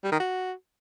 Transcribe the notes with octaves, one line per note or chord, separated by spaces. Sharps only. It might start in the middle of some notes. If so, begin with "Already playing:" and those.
G3
D#3
F#4